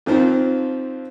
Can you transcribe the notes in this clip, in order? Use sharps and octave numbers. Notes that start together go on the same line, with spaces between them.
F2 D#3 F3 C4